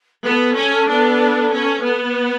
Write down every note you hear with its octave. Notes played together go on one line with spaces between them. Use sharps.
B3 A4
C#4
B3 D4
C#4
B3